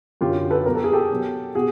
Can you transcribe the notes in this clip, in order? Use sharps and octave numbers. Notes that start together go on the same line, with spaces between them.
F#2 D3 F#3 F4 G4
A4 B4
B2 F#3 A#4
A4
G#4
G4 A4
B2 F#3
B2 F#4 G#4